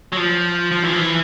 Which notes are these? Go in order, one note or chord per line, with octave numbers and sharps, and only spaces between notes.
F#3
F3
F3
E3
F3
E3